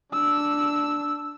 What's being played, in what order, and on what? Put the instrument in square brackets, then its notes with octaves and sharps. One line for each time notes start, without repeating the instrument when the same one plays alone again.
[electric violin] D4 E6